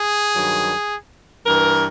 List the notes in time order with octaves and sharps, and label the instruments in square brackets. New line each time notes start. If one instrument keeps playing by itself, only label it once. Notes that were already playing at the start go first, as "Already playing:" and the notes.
Already playing: [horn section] G#4
G2 D#3 F#3
G2 E3 A#4